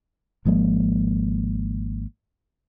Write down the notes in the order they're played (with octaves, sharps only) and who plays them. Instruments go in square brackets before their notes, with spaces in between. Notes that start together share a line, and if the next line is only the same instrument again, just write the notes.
[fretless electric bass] G#1 F3 G#3 A#3